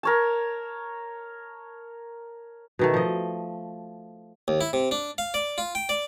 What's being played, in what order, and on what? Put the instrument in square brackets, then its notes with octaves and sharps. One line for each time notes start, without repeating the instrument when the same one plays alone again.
[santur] A#4 C#5 A5
[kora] B2 D#3 A3
F3 D#5
[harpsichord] D#2
E4
C3
D4
F5
D5
F4
G5
D5